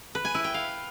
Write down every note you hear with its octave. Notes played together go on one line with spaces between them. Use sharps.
B4
G#5
E4
G5
F5